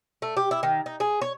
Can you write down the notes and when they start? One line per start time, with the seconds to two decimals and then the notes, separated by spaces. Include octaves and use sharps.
0.22 A3
0.37 G4
0.51 E4
0.63 D#3
0.86 D#4
1.00 G#4
1.22 C#5